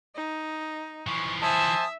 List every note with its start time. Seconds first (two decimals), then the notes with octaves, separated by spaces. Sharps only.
0.15 D#4
1.07 E3 F3 C#6
1.42 C5 E5 G#5 A5 D#6